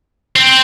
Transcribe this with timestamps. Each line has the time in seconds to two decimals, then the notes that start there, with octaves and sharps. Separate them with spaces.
0.36 C4